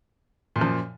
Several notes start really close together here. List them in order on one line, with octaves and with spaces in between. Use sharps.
A#2 F#2 F3